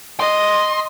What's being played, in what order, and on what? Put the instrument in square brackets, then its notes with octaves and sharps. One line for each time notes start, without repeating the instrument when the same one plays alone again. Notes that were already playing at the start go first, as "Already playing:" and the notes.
[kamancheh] D#5 [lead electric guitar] C6